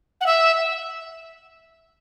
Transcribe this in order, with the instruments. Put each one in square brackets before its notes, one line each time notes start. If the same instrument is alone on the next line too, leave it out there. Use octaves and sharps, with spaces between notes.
[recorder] F#5
E5